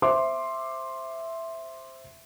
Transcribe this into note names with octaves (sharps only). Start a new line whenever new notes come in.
C5 E5 C6 D6